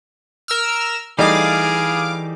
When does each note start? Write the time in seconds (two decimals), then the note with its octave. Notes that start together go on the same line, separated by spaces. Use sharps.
0.48 A#4 E6 F6
1.19 E3 G3 A3 D#4 G#4 F5 D6